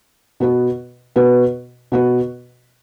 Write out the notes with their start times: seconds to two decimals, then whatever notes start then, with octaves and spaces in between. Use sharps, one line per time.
0.40 B2 B3 F#4 B4
1.16 B2 B3 F#4 B4
1.92 B2 B3 F#4 B4